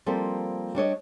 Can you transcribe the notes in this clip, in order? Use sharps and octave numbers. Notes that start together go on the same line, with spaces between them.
F3 G3 A#3 C4 A4
G3 D4 C#5 D#5